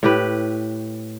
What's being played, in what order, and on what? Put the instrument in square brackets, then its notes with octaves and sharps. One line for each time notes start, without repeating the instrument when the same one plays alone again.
[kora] A2 G4 B4